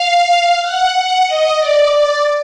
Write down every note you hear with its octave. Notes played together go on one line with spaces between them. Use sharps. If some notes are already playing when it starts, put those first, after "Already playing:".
Already playing: F5
F#5
F#5
D#5
D5
D5